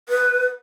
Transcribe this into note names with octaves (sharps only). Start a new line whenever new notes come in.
B4